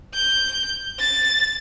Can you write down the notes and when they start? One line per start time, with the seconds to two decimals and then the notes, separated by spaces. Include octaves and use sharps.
0.14 G6
1.00 A6